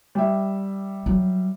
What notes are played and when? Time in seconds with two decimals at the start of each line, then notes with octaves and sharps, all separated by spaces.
0.15 G3 E5
1.06 F#3